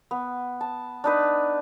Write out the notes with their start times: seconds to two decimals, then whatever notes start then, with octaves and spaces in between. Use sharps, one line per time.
0.11 B3
0.61 A5
1.04 D4 D#4 B4